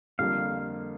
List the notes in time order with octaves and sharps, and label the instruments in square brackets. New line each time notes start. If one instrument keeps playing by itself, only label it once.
[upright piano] F2 D3 G3 A#3 [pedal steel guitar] F5